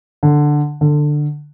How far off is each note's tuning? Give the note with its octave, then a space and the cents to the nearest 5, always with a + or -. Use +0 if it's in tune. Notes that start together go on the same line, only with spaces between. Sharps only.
D3 +5
D3 +15